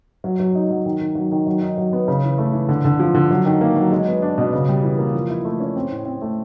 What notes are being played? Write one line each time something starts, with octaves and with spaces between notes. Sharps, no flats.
F#3
F#3
D#4
F#3
D#3
D#3
F#3
D#3
F#3
D#4
F#3
B3
C#3
E3
A3
E3
D3
D3
F3
D3
F#3
D#3
A#3
F#3
G#3
B3
D4
B2
C#3
G3
E3
A#3
F3
E4
A3
C#4
C4
A2
C4
A3